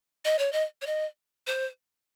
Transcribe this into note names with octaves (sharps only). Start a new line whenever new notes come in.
D#5
C#5
D#5
C#5
D#5
C5